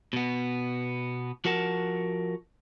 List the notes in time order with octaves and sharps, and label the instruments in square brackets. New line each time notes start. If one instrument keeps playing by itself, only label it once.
[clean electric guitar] B2 B3
F3 F#4 A#4 F#5 A5